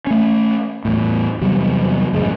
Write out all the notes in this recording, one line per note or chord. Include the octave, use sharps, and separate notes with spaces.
A3 C#4
E2 A2
E2 C3 F#3 G3
A1 F#2 C#3 G#3